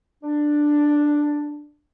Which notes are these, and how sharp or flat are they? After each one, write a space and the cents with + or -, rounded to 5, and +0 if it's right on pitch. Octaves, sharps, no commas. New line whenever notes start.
D4 +5